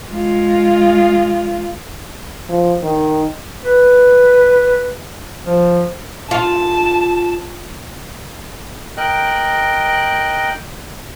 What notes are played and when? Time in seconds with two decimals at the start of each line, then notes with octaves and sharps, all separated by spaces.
0.11 G#3 F4
2.49 F3
2.83 D#3
3.64 B4
5.47 F3
6.31 F4 A5
8.97 A#4 D#5 G5 F#6